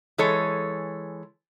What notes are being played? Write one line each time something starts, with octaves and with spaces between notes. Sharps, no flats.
E3 G#3 A4 C#5